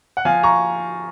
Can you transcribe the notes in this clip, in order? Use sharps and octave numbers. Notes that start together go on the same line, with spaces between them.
F#5
F3 F5 G#5
A#5 C#6